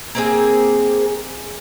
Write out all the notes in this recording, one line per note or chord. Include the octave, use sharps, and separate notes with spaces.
A#3 C4 G#4